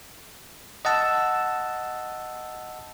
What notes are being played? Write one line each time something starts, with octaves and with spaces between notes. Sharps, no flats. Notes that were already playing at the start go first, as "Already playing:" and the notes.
D#5 F#5 A5 E6